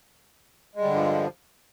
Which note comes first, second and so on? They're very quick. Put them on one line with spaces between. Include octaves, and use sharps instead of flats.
G#3 G3 D3 G2 F3